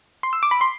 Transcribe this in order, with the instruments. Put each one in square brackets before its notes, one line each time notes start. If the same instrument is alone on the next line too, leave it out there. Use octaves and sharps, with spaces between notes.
[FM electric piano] C6
E6
D6
B5
C6